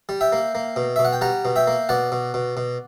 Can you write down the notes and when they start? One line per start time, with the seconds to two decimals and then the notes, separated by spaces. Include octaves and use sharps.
0.09 G3
0.21 E5 G5
0.32 A#3
0.55 A#3
0.76 B2
0.96 B2 E5
1.05 F#5
1.13 G5
1.21 G3 F#5 A#5
1.45 B2
1.56 E5 G5
1.67 A#3
1.89 B2 D5 F#5
2.12 B2
2.34 B2
2.57 B2